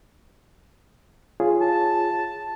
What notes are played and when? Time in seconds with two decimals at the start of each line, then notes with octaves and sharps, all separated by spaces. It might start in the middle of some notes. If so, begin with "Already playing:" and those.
1.40 F4 G#4 C#5
1.61 A5